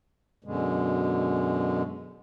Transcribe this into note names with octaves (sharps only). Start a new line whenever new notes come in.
F#2 B2 D3 G#3